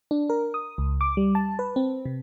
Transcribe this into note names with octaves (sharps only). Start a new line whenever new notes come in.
D4
A#4
D#6
C#2
D6
G3
A5
B4
C4
C3